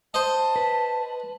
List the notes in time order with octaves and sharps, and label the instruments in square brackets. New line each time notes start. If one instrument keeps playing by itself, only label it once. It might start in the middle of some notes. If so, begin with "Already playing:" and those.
[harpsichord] C5 D#5 [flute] A5
[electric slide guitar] B4